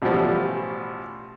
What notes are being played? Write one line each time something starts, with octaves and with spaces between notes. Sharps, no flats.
A1 B2 E3 F3 G3